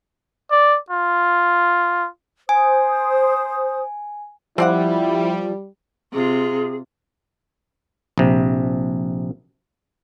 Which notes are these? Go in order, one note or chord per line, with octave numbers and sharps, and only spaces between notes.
D5
F4
C5 G#5 D#6
F3 G3 C4 E4 D5 F#5
C3 F4 G#4
A#1 C3